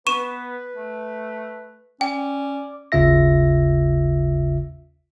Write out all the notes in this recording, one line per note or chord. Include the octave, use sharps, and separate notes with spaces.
B3 B4 C#6 D#7 E7
A3
C#4 D5 G5
G#1 D#2 C#3 F4 E5 A#6